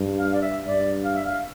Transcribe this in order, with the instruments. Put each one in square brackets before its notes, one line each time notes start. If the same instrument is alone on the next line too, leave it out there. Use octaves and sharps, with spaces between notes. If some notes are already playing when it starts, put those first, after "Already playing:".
Already playing: [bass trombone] G2
[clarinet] F5
D5
E5
[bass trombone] G2 [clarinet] D5
[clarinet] F5
E5
F5